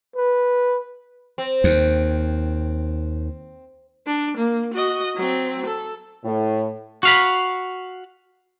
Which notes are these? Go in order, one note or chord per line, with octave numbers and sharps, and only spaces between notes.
B4
C4
D#2
D4
A#3
F#4 D#5
F#3 C4
A4
A2
F#4 F5 B5